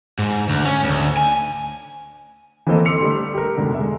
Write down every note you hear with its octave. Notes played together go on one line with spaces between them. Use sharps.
G#2
D2
C#4
D2
G#5
E3 A3 A#3 C4 A4 D#5
C6 D6 E6 C#7 F7
D3 G3 A3
G4 A#4
F1 G#2 B2 D3
G#3 E5